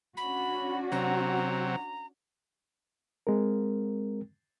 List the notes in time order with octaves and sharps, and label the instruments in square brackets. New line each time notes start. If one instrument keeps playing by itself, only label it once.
[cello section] C#4 D4 F#4 [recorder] B5
[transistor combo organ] C3 F#3 [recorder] A#5
[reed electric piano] G#3 C4 A#4